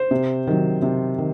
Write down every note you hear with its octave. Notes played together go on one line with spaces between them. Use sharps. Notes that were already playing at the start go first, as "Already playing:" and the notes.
Already playing: C5
C3
D#3 F#3
C3
D#3